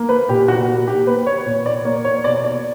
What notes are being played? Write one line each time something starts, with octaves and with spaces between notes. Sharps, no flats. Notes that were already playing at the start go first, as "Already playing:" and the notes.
Already playing: A#3
B4
A#2 G4
F#4
A#3
G4
A#3 B4
C#5
A#2 C#5
D5
A#3 C#5
C#5
B2 D5
D5